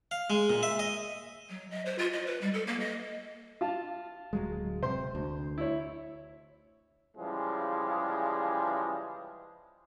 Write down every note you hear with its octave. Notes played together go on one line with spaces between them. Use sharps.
F5
G#3
A#2
E5
D#5
F#3
D#5
C5
F4
D#5
B4
G3
A4
A#3
D#5
F4 F5 A5
D1 F#3 G#3
C3 C5 C6
D2
E4 C#5
C#3 E3 F3 G3 G#3